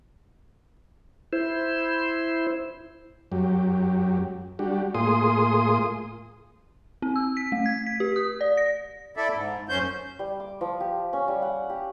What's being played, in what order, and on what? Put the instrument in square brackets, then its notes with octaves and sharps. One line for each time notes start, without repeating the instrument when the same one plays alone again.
[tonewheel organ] E4 C5
[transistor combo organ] F#2 F#3 G4
G3 D4 F#4 G4
A2 A#3 F4 G#4 C6 D#6
[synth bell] C4
E6
B6
A3
G#6
B6
G4
D#6
D5
A#6
[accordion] E4 A4 D5 E5
G#2
F#2 C#4 C5 G6
[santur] G3
D6
F3
G4
C#4
G3
F#5
G4